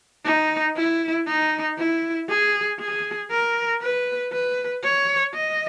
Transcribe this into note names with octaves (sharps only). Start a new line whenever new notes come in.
D#4
E4
D#4
E4
G#4
G#4
A#4
B4
B4
C#5
D#5